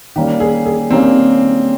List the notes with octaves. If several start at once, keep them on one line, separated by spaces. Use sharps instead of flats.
D#3 G3 A#3 C#4 G4
G#4
G#4
D#3 G3 A#3 C4 C#4